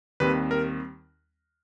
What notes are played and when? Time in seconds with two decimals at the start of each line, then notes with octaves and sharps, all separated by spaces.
0.20 D#2 D#3 G3 C4 B4
0.51 A#4